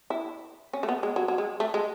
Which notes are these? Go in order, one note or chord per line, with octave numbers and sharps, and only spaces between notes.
E4
C#4
A3
B3
G#3
F#3
F#3
G#3
A3
G#3